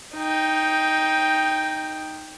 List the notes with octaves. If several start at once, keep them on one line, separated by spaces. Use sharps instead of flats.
D#4 G5